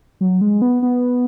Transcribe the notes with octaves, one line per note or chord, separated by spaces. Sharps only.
F#3
G#3
B3
B3